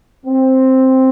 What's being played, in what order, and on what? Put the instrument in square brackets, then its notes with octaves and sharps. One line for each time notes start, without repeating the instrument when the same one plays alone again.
[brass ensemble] C4